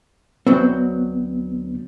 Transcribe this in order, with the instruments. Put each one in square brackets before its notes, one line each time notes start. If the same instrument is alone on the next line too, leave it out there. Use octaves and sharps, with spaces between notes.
[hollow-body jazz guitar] D2 F#3 C4 [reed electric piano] B3